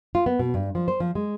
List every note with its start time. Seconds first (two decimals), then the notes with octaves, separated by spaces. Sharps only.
0.15 F4
0.26 B3
0.39 B2
0.54 G2
0.75 F3
0.88 C5
1.00 F3
1.15 G#3